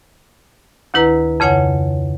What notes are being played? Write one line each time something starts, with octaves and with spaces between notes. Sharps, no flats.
D2 D#3 E4 B4 A#5
F2 C#3 C#5 F#5 G#5